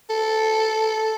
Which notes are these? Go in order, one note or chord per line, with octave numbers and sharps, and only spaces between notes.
A4